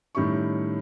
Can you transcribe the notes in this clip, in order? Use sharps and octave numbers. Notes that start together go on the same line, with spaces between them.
A2 D#3 G3 C#4 E4 C#6